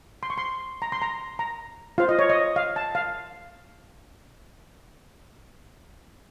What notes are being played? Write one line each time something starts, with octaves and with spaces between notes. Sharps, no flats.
C6
C#6
C6
A#5
C6
A#5
A#5
F4 C5 F5
D#5
C#5
D#5
F5
A5
F5